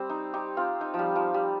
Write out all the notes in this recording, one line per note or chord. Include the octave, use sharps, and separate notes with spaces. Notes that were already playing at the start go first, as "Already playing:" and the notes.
Already playing: G3 C4
D#4
D#4 G4
C4 F4
D#4
F3
G3
F3
G3